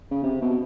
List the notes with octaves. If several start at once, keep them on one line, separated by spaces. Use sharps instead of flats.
C#3
C3
B2